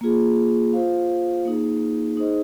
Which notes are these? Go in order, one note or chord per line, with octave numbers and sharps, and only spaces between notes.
A#3 F4 G#4
F4 C5 F5
A#3 D#4 G#4
D#4 G#4 C5 D#5